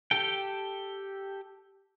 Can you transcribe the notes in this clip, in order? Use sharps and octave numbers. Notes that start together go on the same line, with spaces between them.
G4 A4 G5